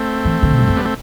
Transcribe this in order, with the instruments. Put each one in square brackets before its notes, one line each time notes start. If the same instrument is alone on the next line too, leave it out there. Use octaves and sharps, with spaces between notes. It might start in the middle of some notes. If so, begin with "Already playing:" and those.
Already playing: [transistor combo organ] A3 C4
[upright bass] E3
D3
B2
G2
E2
[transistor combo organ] G3 B3
A3 C4